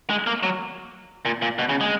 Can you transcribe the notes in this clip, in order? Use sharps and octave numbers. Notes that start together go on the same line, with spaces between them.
G#3
A#3
F#3
A#2
A#2
B2
C#3
G#3